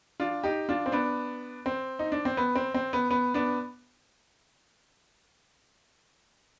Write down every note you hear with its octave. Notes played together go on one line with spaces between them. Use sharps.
D4 F4
D#4 G4
D4 F4
C4
B3 D4
C4
D#4
D4
C4
B3
C4
C4
B3
B3
B3 D4